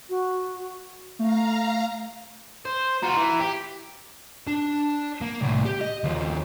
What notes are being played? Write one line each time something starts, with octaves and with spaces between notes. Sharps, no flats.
F#4
A3 F5 A#5
C5
F4 F#4 A#5
E3
G4
D4
A#3
C2 A2
G4
D#5
D#2 F3